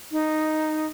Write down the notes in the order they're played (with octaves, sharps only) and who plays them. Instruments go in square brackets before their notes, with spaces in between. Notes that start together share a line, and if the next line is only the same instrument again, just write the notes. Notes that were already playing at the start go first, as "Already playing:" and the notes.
[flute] D#4